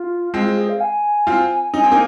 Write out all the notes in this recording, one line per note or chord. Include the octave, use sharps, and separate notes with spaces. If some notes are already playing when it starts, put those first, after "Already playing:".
Already playing: F4
G#3 C4 F4
F4
G#4
F5
G#5
C4 F4
D#4 G#5
C4
A#3 D#4